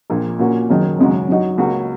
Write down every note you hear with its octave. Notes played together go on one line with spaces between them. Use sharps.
A#1 A#2 A#3
A#2 A#3 C#4 F#4
F#1 F#2 D#3 F#3
G#1 F#2 C#3 G#3 F#4
F#2 F#3 D#4 F#4
C#2 C#3 A#3 F#4